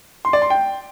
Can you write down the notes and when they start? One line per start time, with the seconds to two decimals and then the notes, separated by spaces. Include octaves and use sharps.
0.25 C6
0.33 D5
0.42 C6
0.50 G5